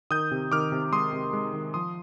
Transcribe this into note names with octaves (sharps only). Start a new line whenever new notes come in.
D#3 D#6 G6
C3
D#3 D6 F6
C3
G#3 C6 D#6
C3
G#3
D#3
F3 C6 D#6